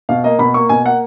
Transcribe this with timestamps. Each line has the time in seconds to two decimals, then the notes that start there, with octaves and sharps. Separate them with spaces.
0.09 B2 F5
0.24 A#3 D#5
0.39 B2 B5
0.54 A#3 C#6
0.69 B2 G#5
0.85 A#3 F#5